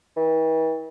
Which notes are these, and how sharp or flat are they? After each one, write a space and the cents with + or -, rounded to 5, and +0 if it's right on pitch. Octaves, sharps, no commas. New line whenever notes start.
E3 -45